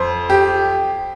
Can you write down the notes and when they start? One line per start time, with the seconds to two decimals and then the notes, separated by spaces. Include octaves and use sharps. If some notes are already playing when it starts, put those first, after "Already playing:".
Already playing: F2 C5
0.30 G4